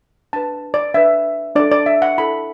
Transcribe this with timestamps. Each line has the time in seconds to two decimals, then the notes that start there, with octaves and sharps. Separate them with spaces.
0.33 D4 B4 A5
0.74 D5
0.94 D4 B4 E5
1.55 D4 A4 D5
1.72 D5
1.86 E5
2.02 F#5
2.18 E4 A4 B5